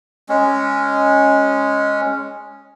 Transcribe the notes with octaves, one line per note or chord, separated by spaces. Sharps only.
G#3 C#4